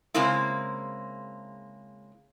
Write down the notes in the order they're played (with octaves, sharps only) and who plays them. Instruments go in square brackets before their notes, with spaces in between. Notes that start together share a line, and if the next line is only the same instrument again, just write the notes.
[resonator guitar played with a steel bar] C#3 G#3 A#3 C4 E4